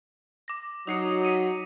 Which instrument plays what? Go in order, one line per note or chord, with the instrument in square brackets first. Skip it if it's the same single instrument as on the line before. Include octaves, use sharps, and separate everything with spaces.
[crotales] D6 A#6
[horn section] F#3 D#4 [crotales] D#6 C7 C#7
[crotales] B6 C#7 D#7